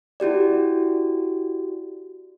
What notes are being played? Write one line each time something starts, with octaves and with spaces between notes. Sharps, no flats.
E4 F#4 G4 D5